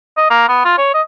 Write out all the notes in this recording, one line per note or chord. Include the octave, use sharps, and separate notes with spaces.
D#5
A#3
B3
F4
C#5
D#5